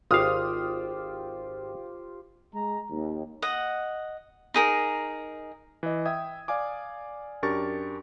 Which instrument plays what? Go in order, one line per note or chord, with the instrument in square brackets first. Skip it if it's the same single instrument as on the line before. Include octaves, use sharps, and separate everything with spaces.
[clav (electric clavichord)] G#1 F5 [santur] F4 G4 C5 [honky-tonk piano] D#6 F6
[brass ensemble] G#3 A#5
D#2
[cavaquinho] D#5 F#5
D#4 G#4 A#4
[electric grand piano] E3 D#5
E5 G5 D#6 G#6
D5 F5 G#5 D6
F#2 D4 G4 A#4 C#6 A6